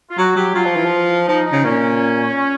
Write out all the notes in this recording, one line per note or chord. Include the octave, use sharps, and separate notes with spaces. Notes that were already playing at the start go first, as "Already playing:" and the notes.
F4
F#3 F#4
F#3 G4
F#3 F4
F3
E3
F3
F3 D#4
D#4
C#3
A#2 C#4